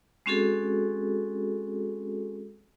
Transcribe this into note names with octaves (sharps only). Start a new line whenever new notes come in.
G#3 C4 C#4 F#4 G#4 A4